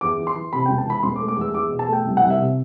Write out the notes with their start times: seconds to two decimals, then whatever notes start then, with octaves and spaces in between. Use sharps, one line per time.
0.01 E2 D6
0.18 E3
0.27 C6
0.35 E3
0.53 C3 B5
0.66 E1 G5
0.78 A5
0.86 E3 B5
1.03 E1 C6
1.16 D6
1.20 A3
1.28 D6
1.37 E2 E6
1.54 E2 D6
1.70 B2
1.79 A5
1.88 A3 G5
2.05 C2
2.17 C2 F#5
2.30 E5
2.39 C3